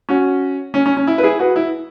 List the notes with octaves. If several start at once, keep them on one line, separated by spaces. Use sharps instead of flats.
C#4 F#4
C#4
C#4
C#4
E4
B4
E4 G#4
F#4 B4
E4